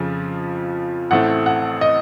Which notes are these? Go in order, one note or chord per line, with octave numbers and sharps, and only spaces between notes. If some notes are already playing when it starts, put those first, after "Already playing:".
Already playing: F2 C#3 F3
A1 A2 A3 C4 F#5
F#5
D#5